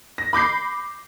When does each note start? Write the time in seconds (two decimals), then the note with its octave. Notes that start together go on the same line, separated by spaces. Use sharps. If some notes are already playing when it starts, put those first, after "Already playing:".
0.18 A#6
0.33 B5 D6 G6 C7